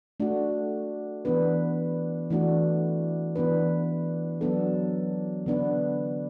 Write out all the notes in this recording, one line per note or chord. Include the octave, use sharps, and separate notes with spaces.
A3 D4 F#4
E3 B3 D4 B4
E3 A3 D4 F#4
E3 B3 D4 B4
F#3 B3 D4 A4
D3 B3 D4 B4